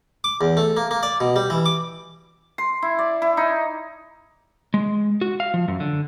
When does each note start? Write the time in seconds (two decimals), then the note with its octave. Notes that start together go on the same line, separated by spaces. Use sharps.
0.24 D6
0.41 E2
0.57 A3
0.77 A#3
0.91 A#3
1.03 D5
1.21 B2
1.36 G3
1.50 E3
1.66 D6
2.58 C6
2.82 E4
2.99 D5
3.22 E4
3.37 D#4
4.74 G#3
5.21 F#4
5.40 F5
5.54 F3
5.68 F#2
5.80 D3